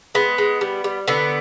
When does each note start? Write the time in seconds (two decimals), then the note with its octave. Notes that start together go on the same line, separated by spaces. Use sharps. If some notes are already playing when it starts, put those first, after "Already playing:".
0.15 G#3 B3
0.38 G#3
0.61 G3
0.84 G3
1.07 D3 B3